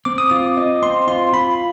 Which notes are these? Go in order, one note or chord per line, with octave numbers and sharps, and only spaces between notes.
C4 D6
D#6
F4 D6
D#5
C4 C6
F4 C6
F4 B5